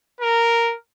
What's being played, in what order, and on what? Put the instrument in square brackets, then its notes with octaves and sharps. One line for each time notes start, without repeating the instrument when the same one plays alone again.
[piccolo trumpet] A#4